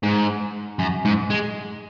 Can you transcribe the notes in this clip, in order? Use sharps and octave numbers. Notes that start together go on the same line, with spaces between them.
G#2
F#2
G#2
G#3